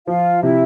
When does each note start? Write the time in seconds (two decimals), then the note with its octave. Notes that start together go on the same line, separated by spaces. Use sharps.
0.07 F3 F4 F5
0.42 C3 E4 E5